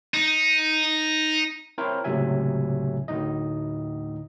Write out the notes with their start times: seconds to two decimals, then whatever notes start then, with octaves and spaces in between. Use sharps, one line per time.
0.14 D#4
1.78 C4 E4 A#4 C5 C#5
2.04 C#2 A2 C3 F#3 E5 G#5
3.08 D2 A2 D#4 D#5